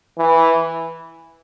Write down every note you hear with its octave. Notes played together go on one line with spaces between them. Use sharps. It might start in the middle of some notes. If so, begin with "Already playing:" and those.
E3